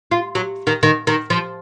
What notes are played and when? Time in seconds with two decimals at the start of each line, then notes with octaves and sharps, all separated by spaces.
0.11 F4
0.35 F#3
0.67 D#3
0.83 D#3
1.07 D#3
1.30 F3